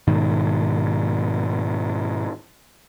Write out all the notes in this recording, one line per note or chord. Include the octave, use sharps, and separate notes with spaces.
G#2 B2 D#3